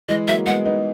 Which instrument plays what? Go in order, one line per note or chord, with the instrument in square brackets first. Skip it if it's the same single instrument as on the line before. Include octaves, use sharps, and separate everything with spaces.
[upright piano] E3 G#3 [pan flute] D#5
[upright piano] F#3 A#3 [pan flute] E5
[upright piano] G#3 B3 [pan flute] F#5
[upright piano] B3 D#4